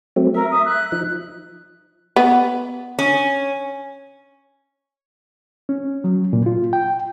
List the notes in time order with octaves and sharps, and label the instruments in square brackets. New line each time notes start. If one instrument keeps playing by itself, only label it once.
[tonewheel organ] F#3 A3 C4
[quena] A#4 [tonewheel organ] E5
[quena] D#6
F#6
[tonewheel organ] F3 D#4
[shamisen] B3
[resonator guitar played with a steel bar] C#4
[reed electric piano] C#4
F#3
A#2
F4
G5